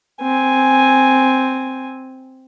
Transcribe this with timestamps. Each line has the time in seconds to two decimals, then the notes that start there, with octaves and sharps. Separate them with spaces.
0.22 C4 G#5